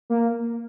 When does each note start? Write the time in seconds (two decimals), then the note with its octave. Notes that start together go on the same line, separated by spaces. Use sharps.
0.10 A#3